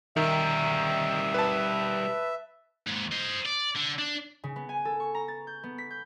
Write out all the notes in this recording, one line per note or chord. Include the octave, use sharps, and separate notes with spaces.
D#3 G3 A#4 E5
B4 A5
D#2 G#2
C5 D#5
D5
D3
D4
C#3
B3
G#5
A4
C#6
A#5
A6
G6
B3
B6
G6